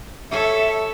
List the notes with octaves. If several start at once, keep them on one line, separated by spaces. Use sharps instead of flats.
A4 C#5 E5